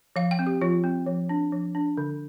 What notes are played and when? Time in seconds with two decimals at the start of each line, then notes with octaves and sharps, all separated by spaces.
0.16 F3 F5
0.31 G5
0.39 C4
0.47 G4
0.61 F3 F4
0.84 C4
1.06 F3
1.29 D4
1.52 F3
1.75 D4
1.97 D3